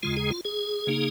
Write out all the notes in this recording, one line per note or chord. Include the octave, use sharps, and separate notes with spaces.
D#2 C#3 G#3 F4
G#4
F4
G#4
C#3 A#3 D#4